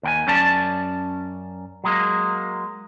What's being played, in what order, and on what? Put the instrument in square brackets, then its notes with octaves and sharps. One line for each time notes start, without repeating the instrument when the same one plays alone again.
[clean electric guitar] D#2 G5 G#5
F#2 C#4 D5 A5
F#3 G#3 A#3